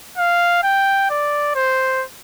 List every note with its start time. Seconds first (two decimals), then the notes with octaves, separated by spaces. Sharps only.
0.18 F5
0.64 G5
1.10 D5
1.56 C5